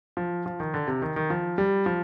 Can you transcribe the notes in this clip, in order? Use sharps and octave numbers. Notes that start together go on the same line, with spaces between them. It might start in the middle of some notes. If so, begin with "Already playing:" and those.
F3
F3
D#3
D3
C3
D#3
D#3
F3
G3
F3